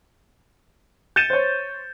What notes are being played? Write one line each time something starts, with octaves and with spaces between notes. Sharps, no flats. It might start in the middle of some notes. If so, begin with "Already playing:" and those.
G6 A6 C#7 D#7 E7
C5 C#5